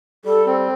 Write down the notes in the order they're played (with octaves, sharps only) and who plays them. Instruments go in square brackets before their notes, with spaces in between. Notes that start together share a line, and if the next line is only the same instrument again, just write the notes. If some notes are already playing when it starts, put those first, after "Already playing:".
[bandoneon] G3 [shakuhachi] A4
[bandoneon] C4